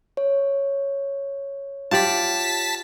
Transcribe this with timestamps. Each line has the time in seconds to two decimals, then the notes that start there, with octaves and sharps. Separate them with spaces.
0.17 C#5
1.91 F4 G4 D5 A5 B6